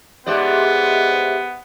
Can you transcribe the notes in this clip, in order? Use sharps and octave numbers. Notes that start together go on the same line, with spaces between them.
G#2 G#3 B3 G4 D5 E5